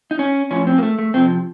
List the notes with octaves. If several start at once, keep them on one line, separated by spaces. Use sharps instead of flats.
D#4
C#4
A2 F3 C#4
C4
A#3
A3
A3
C3 F3 C4